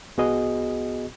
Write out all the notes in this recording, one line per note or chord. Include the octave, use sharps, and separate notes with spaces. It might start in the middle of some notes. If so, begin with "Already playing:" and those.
C2 B3 F#4 G#4 D#5